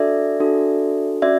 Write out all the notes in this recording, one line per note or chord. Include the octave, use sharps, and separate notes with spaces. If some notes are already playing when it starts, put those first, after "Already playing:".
Already playing: D4 F#4 A4 D5 E5
D4 F#4 A4
C#4 F#4 D5 E5